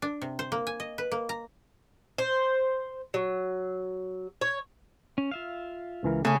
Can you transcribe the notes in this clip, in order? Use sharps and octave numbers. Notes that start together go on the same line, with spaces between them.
D4
C3
C5
A#3
G#5
D#5
B4
A#3
A#5
C5
F#3
C#5
C#4
F4 E5 F5
C#2 E3 A#4
C#3 A3 C#4